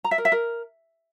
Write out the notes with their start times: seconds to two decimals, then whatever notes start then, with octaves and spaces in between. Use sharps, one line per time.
0.04 A#5
0.11 E5
0.18 A#4
0.25 E5
0.32 A#4